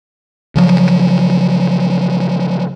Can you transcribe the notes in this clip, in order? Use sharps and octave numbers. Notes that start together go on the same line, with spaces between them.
C#3 F3 F#3